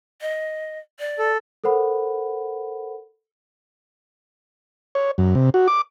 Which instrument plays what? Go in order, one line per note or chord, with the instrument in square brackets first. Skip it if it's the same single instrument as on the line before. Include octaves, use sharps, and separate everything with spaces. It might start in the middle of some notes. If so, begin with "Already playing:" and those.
[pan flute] D#5
D5
[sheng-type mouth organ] A4
[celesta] A4 A#4 C5 F#5 B5
[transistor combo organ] C#5
F#2
C3
F#4
D6